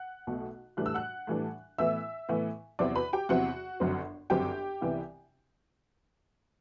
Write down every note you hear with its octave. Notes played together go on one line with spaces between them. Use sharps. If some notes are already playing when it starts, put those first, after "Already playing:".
Already playing: F#5 F#6
B1 B2 A3
A2 E3 G3 D4 F#6
E6
F#5 F#6
A2 E3 G3 D4
A2 E3 B3 E4 E5 E6
A2 E3 B3 E4
E2 C3 F#3 C4 E4 D5 D6
B4 B5
G4 G5
E2 C3 F#3 C4 E4 F#4 F#5
G1 F#2 F#3 C4
G1 F#2 F#3 C4 G4 G5
C2 C3 E3 B3 E4